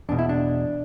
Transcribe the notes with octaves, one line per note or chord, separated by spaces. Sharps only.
E2 B2 D4
E4
D4